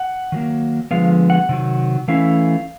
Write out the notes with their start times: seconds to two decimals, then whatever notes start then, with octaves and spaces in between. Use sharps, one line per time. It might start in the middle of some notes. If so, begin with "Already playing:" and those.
Already playing: F#5
0.32 D#3 F#3 A#3
0.91 D3 F3 G#3 B3 F5
1.30 F#5
1.49 C3 D#3 F#3
2.08 E3 A3 C#4 E4 F5